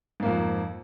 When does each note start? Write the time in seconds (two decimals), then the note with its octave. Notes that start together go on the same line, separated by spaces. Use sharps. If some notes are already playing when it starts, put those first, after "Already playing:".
0.20 G#2
0.23 A#3
0.25 F2